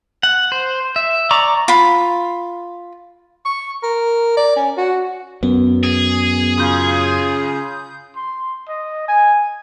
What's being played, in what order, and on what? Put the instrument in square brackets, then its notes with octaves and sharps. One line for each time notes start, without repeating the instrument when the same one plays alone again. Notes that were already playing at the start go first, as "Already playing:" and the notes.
[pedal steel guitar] F#5
C5
E5
D5 A#5 C#6 D6
[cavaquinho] F4 B5
[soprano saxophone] C#6
A#4
D5
C#4
F#4
[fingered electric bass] F#2 [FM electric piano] B3
[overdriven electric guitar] G#4
[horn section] C#3 F4 [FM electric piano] D#6 G6
[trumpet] C6
D#5
G#5